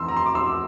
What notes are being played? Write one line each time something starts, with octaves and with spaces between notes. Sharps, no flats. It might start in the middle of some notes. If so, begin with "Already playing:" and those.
Already playing: F2 E3 C6 E6
A#5
C6
D6
C6 E6